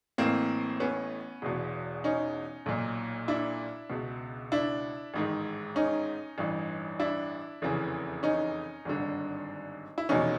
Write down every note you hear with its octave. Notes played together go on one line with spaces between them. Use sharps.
A1 A2 E3 A#3 C4
B3 C#4
E1 E2 B2
C#4 D#4
B1 A#2
D4 E4
C#2 B2
D4 E4
A1 G#2 D#3
C#4 D#4
A1 G2 E3
D4 E4
F1 E2 C#3 E3
C#4 D#4
G#1 G2 D3
E4
F1 E2 B2 C#4 D#4